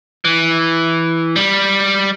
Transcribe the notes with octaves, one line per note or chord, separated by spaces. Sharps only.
E3
G3